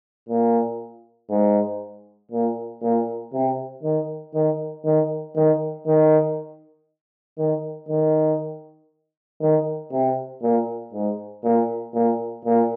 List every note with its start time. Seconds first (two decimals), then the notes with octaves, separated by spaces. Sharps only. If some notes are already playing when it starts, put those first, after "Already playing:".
0.29 A#2
1.30 G#2
2.32 A#2
2.82 A#2
3.33 C3
3.83 D#3
4.34 D#3
4.85 D#3
5.35 D#3
5.86 D#3
7.38 D#3
7.89 D#3
9.41 D#3
9.92 C3
10.43 A#2
10.93 G#2
11.43 A#2
11.94 A#2
12.45 A#2